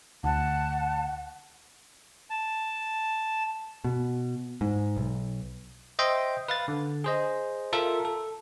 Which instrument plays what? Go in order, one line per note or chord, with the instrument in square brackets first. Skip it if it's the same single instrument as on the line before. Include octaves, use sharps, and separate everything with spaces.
[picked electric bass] D2 [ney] F#5 [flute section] A5
[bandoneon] A5
[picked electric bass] B2
G#2
B1
[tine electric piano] C5 D#5 E5 G5 C6
B4 F5 A6
D3
G#4 C5 D#5
F4 A4 A#4 E5
A4